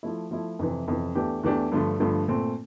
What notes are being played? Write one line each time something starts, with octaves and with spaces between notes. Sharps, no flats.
F3 A3 E4
F3 A3 E4
F2 C3 E3
F2 C3 E3
E2 E3 A3 D4 G4
E2 E3 A3 D4 G4
G2 D3 F3 A3
G2 D3 F3 A3
A#2 A3 C4